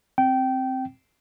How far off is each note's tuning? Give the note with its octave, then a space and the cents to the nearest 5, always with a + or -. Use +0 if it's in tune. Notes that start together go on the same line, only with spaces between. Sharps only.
C4 +0 G5 -20